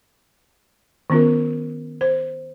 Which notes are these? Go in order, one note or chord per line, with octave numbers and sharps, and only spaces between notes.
D#3 B3 C#4 F4 A#4
C5